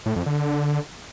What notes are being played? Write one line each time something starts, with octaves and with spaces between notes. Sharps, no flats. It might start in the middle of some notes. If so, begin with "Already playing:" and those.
A2
F2
D3